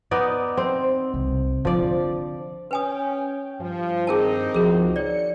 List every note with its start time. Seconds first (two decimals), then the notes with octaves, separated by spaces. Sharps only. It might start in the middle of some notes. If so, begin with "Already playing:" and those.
0.11 B3 D#4 D5
0.57 C4
1.14 C2
1.65 D3 F3 D5
2.71 C#4 B4 G5 G#5 D#6
3.59 G2 F3
4.07 D#3 C4 D#4 G#4 A#4 A5
4.55 C#2 F3 F#4 G#4 A#4
4.96 C#5 D5 C#7